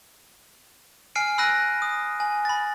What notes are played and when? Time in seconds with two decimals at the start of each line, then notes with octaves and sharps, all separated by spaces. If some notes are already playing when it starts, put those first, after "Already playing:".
1.15 G#5 F6 C7 D7
1.38 B5 E6 F#6 A#6 D#7
1.82 D#6
2.20 G#5
2.45 B5 A6